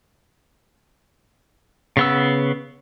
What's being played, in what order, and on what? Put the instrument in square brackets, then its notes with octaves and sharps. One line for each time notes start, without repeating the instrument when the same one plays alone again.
[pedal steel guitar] C#3 B3 E6